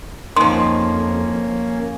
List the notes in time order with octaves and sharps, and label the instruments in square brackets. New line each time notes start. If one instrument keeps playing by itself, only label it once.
[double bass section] F2 [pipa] D#3 F3 [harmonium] A#3 C#4 [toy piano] C6